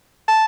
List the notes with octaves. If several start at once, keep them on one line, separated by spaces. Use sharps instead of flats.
A5